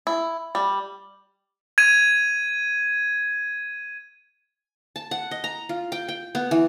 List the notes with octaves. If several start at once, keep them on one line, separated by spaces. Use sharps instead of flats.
E4
G3
G#6 D#7
A5
F#5
D#5
A#5
F4
G5
G5
B3
E3